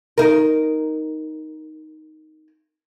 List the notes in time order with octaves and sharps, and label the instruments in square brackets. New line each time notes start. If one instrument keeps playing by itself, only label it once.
[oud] D#4 A#4